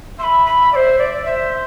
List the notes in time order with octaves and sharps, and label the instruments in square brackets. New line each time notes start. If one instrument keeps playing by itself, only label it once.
[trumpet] E5 [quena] C6
[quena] B5
B5
[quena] C5 D5 [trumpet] E5
[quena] D5
[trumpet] C5 [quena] E5